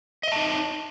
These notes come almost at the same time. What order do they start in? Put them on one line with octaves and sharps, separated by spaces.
D#5 E5 A5 D#4